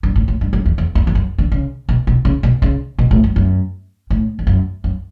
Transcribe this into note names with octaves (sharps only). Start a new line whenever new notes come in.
G2
A2
A2
G2
F#2
E2
E2
E2
E2
F#2
D3
C#3
B2
B2
C#3
B2
C#3
B2
A2
F#2
F#2
A2
E2
F#2
F#2